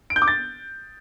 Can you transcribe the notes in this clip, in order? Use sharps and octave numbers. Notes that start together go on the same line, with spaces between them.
D7
G6
D6
A6